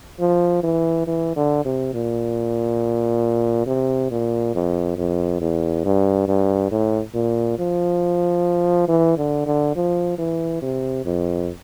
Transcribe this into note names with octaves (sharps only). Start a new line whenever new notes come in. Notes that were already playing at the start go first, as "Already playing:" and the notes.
F3
E3
E3
D3
C3
A#2
C3
A#2
F2
F2
E2
G2
G2
A2
A#2
F3
E3
D3
D3
F3
E3
C3
F2